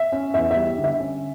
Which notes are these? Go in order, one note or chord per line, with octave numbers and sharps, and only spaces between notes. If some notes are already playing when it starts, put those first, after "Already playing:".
Already playing: E5
C#4
E2 E5
E5
G3
D3
E5
C#4